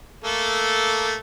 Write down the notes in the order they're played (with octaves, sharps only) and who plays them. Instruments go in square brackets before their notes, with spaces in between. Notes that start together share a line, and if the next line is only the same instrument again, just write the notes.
[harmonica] A3 A#3 A4